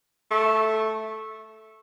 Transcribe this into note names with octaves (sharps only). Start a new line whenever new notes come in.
A3